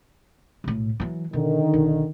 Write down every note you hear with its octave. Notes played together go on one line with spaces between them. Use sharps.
B1 A2
E3 F#3
B2 D3 D#3
B1